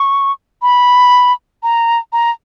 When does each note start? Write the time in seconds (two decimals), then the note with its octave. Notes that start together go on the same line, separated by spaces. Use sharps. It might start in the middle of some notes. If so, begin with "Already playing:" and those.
Already playing: C#6
0.62 B5
1.63 A#5
2.13 A#5